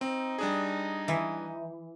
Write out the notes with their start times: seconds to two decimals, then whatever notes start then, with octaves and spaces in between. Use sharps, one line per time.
0.01 C4 D#4
0.38 G3 D4 G#4
1.08 E3